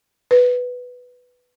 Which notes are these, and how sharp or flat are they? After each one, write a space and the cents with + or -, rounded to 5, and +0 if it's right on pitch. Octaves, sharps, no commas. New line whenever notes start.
B4 +5